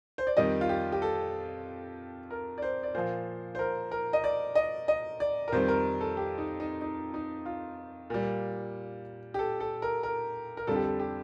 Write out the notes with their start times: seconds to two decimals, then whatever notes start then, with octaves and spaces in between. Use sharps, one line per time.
0.18 C5
0.27 D5
0.37 F2 D#3 G3 D#5
0.61 F4
0.69 G4
0.92 G4
1.02 A4
2.31 A#4
2.58 D5
2.62 C5
2.83 D5
2.95 A#2 F3 C5
3.55 C5
3.59 A#4
3.92 A#4
4.13 D#5
4.24 D5
4.55 D#5
4.88 D#5
5.20 D5
5.48 A#4
5.52 F2 D#3 G3 C5
5.68 A#4
6.01 A4
6.17 G4
6.38 D#4
6.60 D#4
6.81 D#4
7.14 D#4
7.46 F4
8.10 A#2 G3
9.34 G4
9.39 A4
9.60 A4
9.82 A#4
10.03 A#4
10.57 A#4
10.67 F2 D3 G3 A4
10.76 G4
10.84 A4
10.99 G4